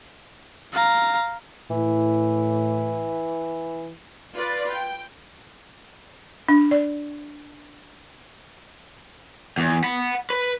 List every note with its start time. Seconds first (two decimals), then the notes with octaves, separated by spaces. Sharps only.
0.73 F5 A#5
1.70 A2 E3
4.34 F4 B4 D5
4.71 G5
6.48 D4
6.71 D5
9.58 E2
9.84 F#5 B5
10.30 B4